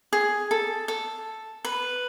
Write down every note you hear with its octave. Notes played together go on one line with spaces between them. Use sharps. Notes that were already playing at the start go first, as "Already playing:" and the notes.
G#4
A4
A4
B4